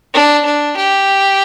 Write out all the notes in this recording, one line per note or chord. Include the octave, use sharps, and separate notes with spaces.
D4
D4
G4